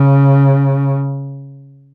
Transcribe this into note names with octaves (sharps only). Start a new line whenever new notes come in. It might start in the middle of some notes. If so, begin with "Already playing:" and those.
Already playing: C#3